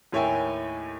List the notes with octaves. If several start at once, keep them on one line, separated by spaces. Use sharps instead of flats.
D#2 A2 C#5 E5 G5 G#5